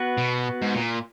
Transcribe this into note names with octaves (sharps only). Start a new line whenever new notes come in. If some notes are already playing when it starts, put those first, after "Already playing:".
Already playing: B3 F#4 B4
B2
G#2
A#2